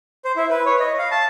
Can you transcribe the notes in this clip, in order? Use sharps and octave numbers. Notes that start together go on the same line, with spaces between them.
C5
E4
B4
C#5
D#5
F5
A5